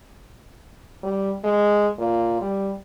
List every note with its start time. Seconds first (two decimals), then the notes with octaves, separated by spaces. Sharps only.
1.03 G3
1.44 G#3
1.99 A#2
2.41 G3